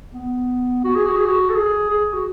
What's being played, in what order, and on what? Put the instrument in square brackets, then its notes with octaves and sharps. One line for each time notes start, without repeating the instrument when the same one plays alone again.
[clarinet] B3
F#4
G#4
F#4
G#4
F#4
A4
G#4
G#4
F#4